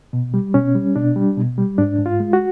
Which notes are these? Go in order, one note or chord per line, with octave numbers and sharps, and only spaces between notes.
B2
G3
B2 C#4
G3
B2 D4
G3
B2
G3
G#2 D4
G#2
F4
G#3
F#4